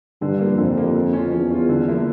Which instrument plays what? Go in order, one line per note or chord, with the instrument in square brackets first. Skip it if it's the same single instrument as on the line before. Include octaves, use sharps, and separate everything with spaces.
[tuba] G2 [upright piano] D3
[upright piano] A#3
F3
[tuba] F2 [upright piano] D3
[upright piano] F3 A#3
F3
C#4 F4
[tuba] E2 [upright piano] F3
[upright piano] C#4 F4
D3
F3 A#3 E4